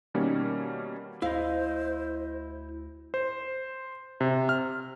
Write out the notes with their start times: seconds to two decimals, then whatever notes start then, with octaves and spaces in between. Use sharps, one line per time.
0.14 B2 D#3 G3 A#3 C#4
1.22 D2 E4 C5 D#5 F5
3.14 C5
4.21 C3
4.49 F6